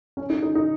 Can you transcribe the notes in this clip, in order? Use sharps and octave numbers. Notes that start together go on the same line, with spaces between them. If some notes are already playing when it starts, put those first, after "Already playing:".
C#4
D#4
D#4
D#4